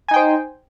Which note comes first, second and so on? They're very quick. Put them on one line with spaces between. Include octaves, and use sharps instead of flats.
G#5 D#4 G5 C5